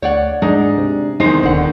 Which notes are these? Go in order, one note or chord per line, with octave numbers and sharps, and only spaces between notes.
D2 C#5 D5 F#5
G#2 D4 D#4 G#4
C3
E2 D#3 G#3 D#4 C5
D#1 D3 F#5